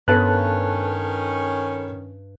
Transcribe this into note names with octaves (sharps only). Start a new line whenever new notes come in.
G2 D#3 B3 C#4 A4 B4 A5 F#6